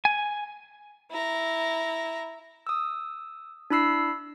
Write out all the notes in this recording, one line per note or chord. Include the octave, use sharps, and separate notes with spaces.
G#5
E4 A#5
D#6 E6
D4 E4 B5 E6 C7